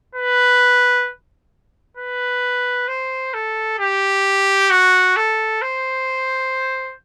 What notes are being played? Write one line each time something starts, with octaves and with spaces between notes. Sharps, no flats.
B4
B4
C5
A4
G4
F#4
A4
C5